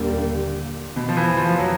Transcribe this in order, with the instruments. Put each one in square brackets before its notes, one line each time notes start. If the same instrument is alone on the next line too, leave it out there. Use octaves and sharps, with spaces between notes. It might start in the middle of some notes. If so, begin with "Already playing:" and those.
Already playing: [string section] D#2 D3 G3 A#3 [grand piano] A#2
[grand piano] B2
F3
E3
F3
F3
F#3